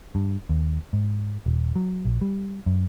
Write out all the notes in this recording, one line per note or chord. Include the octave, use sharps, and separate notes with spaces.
G2
D#2
G#2
D#1
F#3
A#1
G3
F#2